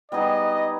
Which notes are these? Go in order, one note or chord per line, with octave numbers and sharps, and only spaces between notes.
G3 B3 D#4 G#4 D#5